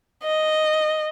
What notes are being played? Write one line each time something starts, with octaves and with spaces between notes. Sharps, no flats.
D#5